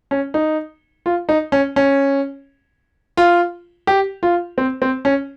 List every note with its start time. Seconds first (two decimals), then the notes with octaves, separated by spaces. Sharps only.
0.11 C#4
0.34 D#4
1.06 F4
1.29 D#4
1.52 C#4
1.76 C#4
3.17 F4
3.87 G4
4.23 F4
4.58 C4
4.82 C4
5.05 C#4